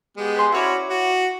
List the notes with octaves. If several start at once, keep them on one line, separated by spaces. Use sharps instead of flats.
G#3 B3 G4
B4 G#5 C6
C#4 E4 F#4 C#5 D5
F#4